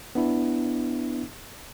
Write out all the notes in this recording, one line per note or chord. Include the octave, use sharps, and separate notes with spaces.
B3 D4 E4